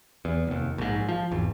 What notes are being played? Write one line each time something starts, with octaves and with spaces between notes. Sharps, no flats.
E2
F1 D#2
A#1 G#2
F3
G#1 E2